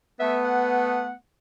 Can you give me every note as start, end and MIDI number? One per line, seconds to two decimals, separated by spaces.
0.20 1.11 57
0.20 1.11 59
0.20 0.36 76
0.44 1.12 78